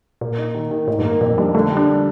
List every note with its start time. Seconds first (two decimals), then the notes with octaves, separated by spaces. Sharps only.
0.21 A#2 A#3
0.38 D#4
0.55 D#3
0.71 D#3
0.88 A2 D#3
0.99 G2
1.05 A#3
1.21 F2 A#2
1.38 G3 D4
1.54 D3 A3
1.71 G3
1.77 D4